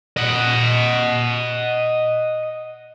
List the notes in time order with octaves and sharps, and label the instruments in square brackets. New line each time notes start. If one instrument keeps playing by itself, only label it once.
[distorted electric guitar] D#5 F#5